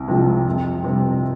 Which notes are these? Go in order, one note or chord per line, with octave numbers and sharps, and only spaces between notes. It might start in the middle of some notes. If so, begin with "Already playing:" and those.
Already playing: C2
C3 F3 G#3
F2
C3 G3 C4